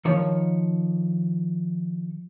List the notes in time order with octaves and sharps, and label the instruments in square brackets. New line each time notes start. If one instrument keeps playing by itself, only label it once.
[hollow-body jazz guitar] D#3 F3 C#5